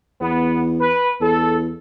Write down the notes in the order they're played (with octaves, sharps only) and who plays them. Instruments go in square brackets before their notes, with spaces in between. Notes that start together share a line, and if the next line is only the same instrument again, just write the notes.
[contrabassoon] E2 [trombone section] B3
[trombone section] B4
[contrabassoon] E2 [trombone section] A4